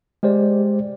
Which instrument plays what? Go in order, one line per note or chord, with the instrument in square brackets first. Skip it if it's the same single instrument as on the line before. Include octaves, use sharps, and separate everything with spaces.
[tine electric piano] G#3 G4 C5 D5